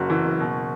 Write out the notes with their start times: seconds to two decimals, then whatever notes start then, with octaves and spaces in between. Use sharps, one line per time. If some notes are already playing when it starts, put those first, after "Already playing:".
Already playing: F#1 F#2 F#4
0.10 E3
0.25 F#1
0.40 B2